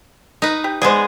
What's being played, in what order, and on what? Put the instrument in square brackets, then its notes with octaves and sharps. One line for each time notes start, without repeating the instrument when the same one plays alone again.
[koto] D#4 B4
[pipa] G4
[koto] G#3 B3 G#4 [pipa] C5 D5